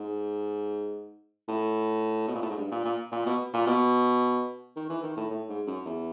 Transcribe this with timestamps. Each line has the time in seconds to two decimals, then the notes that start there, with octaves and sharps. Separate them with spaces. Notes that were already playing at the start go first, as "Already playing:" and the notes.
Already playing: G#2
1.48 A2
2.28 B2
2.35 A#2
2.42 A2
2.50 G#2
2.57 G2
2.71 A#2
2.85 A#2
3.12 A#2
3.26 B2
3.54 A#2
3.67 B2
4.76 D#3
4.90 E3
5.03 D#3
5.17 A2
5.31 A2
5.49 G#2
5.67 F#2
5.85 E2